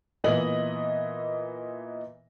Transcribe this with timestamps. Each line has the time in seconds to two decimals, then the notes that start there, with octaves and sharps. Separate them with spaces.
0.24 A#2 E3 B3 D#5 E5 F#7